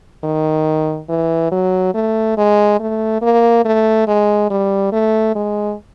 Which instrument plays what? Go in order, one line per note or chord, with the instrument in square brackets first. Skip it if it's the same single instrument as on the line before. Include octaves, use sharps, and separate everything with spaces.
[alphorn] D#3
E3
F#3
A3
G#3
A3
A#3
A3
G#3
G3
A3
G#3